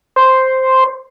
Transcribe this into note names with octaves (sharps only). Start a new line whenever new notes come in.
C5